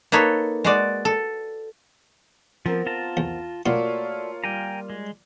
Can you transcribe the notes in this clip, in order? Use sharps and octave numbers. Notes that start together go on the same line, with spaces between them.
A#3 D#4 A4 B4 C#5
G#3 F#4 D5
A4
F3 B3 C4 A#4
F4 A5 A#5
E2
B2 A3 A#3 F4 F#4 C#5 D5
G3 G5 G#5 A#5
G#3